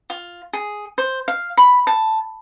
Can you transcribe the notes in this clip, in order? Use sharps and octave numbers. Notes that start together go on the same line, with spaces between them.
F4
G#4
C5
F5
B5
A5